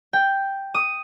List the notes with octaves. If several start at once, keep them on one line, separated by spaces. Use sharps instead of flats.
G5
D#6